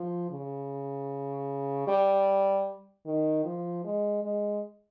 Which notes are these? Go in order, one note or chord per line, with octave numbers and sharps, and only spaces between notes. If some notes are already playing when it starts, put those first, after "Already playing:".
Already playing: F3
C#3
G3
D#3
F3
G#3
G#3